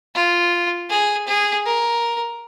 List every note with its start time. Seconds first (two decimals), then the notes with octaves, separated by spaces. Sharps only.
0.15 F4
0.90 G#4
1.27 G#4
1.66 A#4